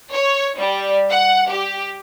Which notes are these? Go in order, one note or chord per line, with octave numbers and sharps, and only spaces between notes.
C#5
G3
F#5
G4